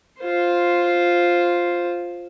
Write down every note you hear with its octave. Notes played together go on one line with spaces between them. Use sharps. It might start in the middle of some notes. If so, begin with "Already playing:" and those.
F4 C5